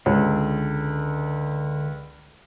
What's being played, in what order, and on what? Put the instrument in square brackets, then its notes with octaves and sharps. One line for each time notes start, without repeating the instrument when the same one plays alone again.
[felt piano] C#2 [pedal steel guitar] D3